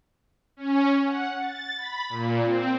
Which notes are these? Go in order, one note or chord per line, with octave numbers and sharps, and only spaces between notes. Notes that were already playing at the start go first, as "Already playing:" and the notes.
C#4
F#5
A6
B5
A#2
C4